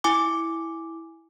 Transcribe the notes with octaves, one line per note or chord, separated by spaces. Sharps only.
E4 G#5 D6